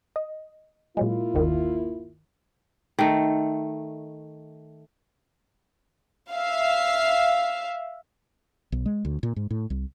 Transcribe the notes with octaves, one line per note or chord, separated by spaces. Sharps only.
D#5
A#2 F#3 G#3 A#3 E4 F4
G1 D#2 D#3
D#3 A3
E5 F5
B1
G#3
D2
A#2
G#2
A2
C2